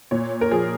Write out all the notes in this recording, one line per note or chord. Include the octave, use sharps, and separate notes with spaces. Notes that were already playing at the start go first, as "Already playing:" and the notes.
A#2 C#5
A#4
F3 G#4